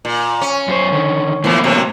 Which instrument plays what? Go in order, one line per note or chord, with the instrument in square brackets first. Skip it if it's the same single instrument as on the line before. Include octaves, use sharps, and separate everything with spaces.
[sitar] A#2
C#4
[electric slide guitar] F#2 G4 C5
D3 D#3
[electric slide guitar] A2 A#3 B3 [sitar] E3 F3
[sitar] F#2 C3 F#3